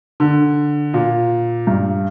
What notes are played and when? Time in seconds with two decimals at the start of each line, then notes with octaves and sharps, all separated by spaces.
0.20 D3
0.94 A#2
1.67 G2